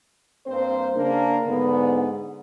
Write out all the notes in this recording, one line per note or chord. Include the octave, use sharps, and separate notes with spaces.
G2 A#3 C4 C5
C#3 A#3 D4
G#2 D3 B3